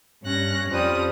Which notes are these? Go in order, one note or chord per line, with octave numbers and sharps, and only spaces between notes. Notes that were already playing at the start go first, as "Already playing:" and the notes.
G2 C#4 F#6 A#6
F2 F3 G3 D#6